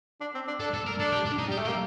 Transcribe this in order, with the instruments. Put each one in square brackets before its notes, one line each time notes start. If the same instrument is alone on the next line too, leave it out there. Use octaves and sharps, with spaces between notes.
[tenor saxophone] D4
C4
D4
[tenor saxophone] D4 [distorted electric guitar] A4
[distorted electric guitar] A4
A#4
[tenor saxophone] D4 [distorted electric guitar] A4
[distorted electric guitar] G4
D4
D#4
[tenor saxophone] G3 [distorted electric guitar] G4
[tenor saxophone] A3
[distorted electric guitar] G4
[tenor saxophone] A#3